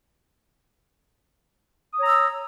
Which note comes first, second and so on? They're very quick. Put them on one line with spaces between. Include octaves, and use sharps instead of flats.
D#6 C#5 A#5 E6